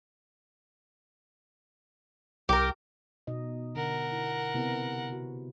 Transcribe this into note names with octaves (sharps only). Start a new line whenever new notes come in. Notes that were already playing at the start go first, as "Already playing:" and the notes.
C2 G4 A#4
B2 D#4 D#5
D3 A#4 F#5
E4
C3 B3 E4
F#4